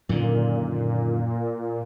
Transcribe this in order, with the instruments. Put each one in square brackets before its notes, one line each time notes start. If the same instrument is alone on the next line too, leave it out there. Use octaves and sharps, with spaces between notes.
[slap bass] F#2 D3 D#3 [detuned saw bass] A#2